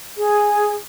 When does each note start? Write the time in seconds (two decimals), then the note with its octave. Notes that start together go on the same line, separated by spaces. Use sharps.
0.17 G#4